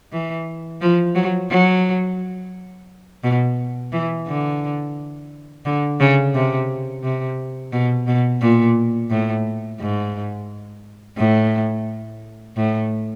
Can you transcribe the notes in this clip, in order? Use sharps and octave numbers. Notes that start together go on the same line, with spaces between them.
E3
F3
F#3
F#3
B2
E3
D3
D3
C#3
C3
C3
B2
B2
A#2
A2
G#2
A2
A2